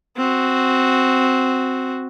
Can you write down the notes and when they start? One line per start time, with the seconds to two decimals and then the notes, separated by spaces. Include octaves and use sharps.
0.16 C4 F#4